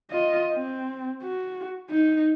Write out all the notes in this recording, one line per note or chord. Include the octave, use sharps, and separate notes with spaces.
F4 D#5
C4
F#4
D#4